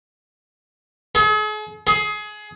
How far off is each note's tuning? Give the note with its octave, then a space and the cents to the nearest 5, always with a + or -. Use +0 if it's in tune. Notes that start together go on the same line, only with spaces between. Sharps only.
G#4 +45
G#4 +25